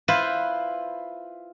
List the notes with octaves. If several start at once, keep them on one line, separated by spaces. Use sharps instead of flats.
E4 F4 B4 C5